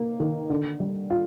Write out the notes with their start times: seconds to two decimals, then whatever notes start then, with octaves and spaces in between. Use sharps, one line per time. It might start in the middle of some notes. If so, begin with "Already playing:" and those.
Already playing: A#3
0.20 D#3
0.50 D3
0.80 G3
1.10 F4